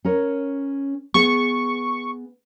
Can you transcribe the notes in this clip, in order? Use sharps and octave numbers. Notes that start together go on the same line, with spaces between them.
C#4 A#4 C#5
B3 G#4 C#6